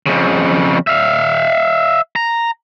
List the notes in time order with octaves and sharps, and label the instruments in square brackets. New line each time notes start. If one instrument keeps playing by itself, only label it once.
[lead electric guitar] F2 C#3
E5 F5
A#5